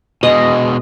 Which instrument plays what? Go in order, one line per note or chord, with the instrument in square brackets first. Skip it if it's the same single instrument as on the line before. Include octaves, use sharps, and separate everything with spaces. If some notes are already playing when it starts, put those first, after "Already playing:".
[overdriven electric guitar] B2 G#3 [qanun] D#5